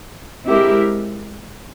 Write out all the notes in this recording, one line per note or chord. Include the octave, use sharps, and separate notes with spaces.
G#3 C4 E4 G4 A#4